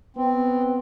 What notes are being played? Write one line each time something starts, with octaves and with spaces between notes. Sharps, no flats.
B3 C4